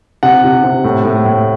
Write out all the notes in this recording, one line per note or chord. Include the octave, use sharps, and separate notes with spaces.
C3 F#5
C3
C3
A2
A2
A2